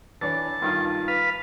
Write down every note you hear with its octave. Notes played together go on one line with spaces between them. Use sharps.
E3 D4 C#5 A5
G2 D#3 F4
B4 F5